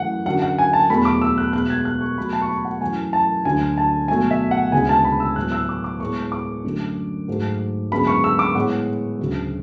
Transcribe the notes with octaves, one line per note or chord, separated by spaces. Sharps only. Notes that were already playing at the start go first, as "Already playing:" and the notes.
Already playing: F#2 E3 A3 F#5
F#2 D3 F#3 F#5
F#5
G#5
A5
E2 B2 F#3 A3 B5
D6
E6
F#6
B2 G#3 B3 F#6
G#6
F#6
C#6
B2 F#3 A3 B5
A5
C#6
B5
F#5
F#2 E3 A3 G#5
A5
D2 D3 F#3 A3 G#5
A5
B2 F#3 A3 G#5
E5
F#5
D2 C#3 G#3 B3 G#5
A5
B5
E6
A2 F#3 B3 F#6
E6
D6
D6
A2 G#3 B3 C#6
D6
F#2 D3 A3
G#2 F#3 A3
F#2 D3 G#3 B3 B5
C#6
E6
D6
A2 G#3 B3 F#5
D2 C#3 F#3